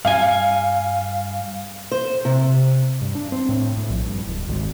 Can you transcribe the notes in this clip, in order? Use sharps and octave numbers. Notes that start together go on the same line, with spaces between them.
G2 F5 G#5
C5
C3
G2
D4
C4
A2
A2
A#1
G2
D1
G#1